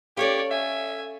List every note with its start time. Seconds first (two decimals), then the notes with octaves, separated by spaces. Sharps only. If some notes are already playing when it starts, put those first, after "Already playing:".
0.17 C#4 G4 A4 C#5 D5 F5
0.51 E5 G#5